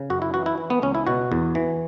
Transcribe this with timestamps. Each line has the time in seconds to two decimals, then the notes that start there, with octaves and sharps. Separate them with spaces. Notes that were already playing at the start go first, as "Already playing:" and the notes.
Already playing: C#3
0.10 F#2 F#4
0.22 E4
0.34 E3 F#4
0.46 E4
0.58 E3
0.70 B3
0.82 C#2 C#4
0.95 E4
1.07 B2 F#4
1.32 E2
1.55 E3